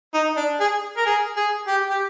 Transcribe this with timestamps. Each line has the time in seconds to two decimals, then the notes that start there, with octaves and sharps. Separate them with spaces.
0.14 D#4
0.36 D4
0.60 G#4
0.97 A#4
1.06 G#4
1.37 G#4
1.67 G4
1.89 G4